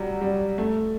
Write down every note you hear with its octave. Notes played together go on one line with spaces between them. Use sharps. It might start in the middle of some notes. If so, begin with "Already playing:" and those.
Already playing: F#3 G3
G3
A3